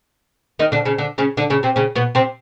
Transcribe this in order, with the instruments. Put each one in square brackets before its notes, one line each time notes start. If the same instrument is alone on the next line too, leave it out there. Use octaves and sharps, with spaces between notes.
[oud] D#3 D#4
D3 D4
C#3 C#4
D3 D4
C#3 C#4
D3 D4
C#3 C#4
C3 C4
C#3 C#4
B2 B3
C3 C4